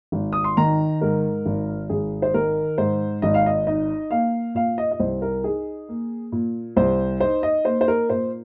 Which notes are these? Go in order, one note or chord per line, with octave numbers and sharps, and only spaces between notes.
G#1
D#6
C6
D#3 A#5
G#2 A#4
G#1
G#1 G#4
C5
D#3 A#4
G#2 C5
G#1 D#5
F5
D#5
D#4 D#5
A#3 F5
A#2 F5
D#5
D#5
C2 C5
A#4
D#4 G#4
A#3
A#2
C2 C5
D#4 C5
D#5
A#3 C5
C5
A#4
A#2 C5